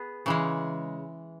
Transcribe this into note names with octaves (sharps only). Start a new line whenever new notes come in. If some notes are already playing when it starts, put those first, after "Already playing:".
Already playing: B3 G#4
C#3 E3 G#3